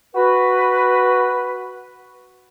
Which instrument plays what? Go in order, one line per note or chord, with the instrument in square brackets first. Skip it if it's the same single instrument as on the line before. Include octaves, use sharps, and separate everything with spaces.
[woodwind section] F#4 B4